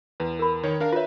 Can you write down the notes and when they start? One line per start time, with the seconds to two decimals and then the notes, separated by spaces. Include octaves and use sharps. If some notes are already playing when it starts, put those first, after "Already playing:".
0.20 E2 B4
0.39 A#4 B5
0.63 D#3 C#5
0.80 D4 A#4 F5
0.92 F4 B4 C#5 E5